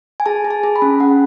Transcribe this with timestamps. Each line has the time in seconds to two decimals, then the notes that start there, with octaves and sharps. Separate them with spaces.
0.20 G#5
0.26 G#4 A5
0.45 G#4
0.51 A5
0.63 G#4
0.76 B5
0.82 C#4
1.00 C#4 F#5